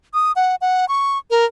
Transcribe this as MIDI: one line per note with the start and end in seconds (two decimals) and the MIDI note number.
0.14 0.32 87
0.36 0.55 78
0.61 0.88 78
0.89 1.18 85
1.30 1.45 70